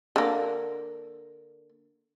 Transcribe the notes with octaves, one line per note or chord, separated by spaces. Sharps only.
D3 A#3